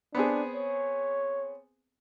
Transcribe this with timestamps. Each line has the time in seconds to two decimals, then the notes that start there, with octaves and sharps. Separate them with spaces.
0.15 B3 C4 D4 G#4
0.55 C#5